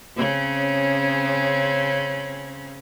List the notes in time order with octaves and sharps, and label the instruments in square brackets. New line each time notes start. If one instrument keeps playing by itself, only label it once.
[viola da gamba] C#3 C4 C#4